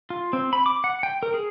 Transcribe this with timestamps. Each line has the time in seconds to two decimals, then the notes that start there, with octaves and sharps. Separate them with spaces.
0.10 F4
0.33 C4
0.53 B5
0.66 D6
0.84 F#5
1.03 G5
1.23 A#4
1.34 G#4